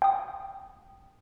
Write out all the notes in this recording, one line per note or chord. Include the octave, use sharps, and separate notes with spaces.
G5 D#6